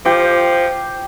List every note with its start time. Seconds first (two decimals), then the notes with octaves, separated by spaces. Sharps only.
0.05 F3 G4